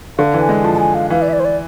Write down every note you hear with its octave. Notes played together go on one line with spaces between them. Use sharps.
D3 F5
E3
G#5
G#3
F3 A5
A5
G#5
F5
E3 F5
D5
E5
D5
C5
D5